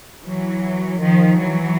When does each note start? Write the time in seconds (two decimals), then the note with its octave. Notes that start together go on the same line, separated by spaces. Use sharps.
0.24 E3 F#3
1.00 D#3 F3
1.38 E3 F#3